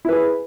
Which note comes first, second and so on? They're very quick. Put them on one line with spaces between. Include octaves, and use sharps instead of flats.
E4 B4 G#4